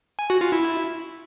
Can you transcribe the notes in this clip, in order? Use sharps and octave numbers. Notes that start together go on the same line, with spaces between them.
G#5
F#4
F4
E4